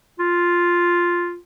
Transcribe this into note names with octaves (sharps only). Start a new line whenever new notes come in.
F4